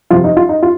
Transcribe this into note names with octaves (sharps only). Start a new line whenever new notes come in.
F2 C3 F3 F4
D#4
F4
D#4
F4